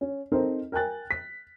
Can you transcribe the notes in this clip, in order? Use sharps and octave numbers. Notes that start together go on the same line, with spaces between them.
C#4
C4 D#4 A4 A#4 C5
A#4 G5 G#5 F#6 A6
B6